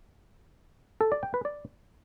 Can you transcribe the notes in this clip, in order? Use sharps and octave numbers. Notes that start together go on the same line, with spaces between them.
A4
D5
G5
B4
D5